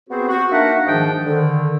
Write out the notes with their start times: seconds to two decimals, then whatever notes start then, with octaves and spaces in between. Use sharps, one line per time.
0.09 B3 C4 F#4 G#4 C5
0.28 F#4
0.52 A#3 D4 D#4 A#4 E5 F#5
0.86 G#2 D#3 F3 D4 G#4 G5
1.26 D3 D#3